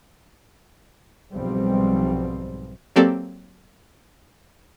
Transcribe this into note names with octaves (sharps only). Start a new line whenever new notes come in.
B1 G#2 B2 F3 G3 C4
F#3 A#3 C4 G4 A4 D5